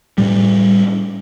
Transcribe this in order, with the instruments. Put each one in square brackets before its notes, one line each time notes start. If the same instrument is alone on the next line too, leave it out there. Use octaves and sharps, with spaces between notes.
[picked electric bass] A2 G3